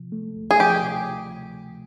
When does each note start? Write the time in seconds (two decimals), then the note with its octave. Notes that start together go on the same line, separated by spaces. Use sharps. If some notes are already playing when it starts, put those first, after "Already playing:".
Already playing: C3 F3
0.12 A3
0.36 D2
0.51 G#4
0.60 F3 G4
0.83 C3